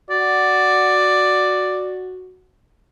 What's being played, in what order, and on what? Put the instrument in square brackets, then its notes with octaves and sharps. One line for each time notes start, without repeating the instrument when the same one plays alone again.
[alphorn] F#4 [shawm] D5